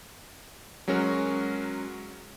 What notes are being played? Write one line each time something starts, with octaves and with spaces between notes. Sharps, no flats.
F#3 G#3 C#4 F#4 A#4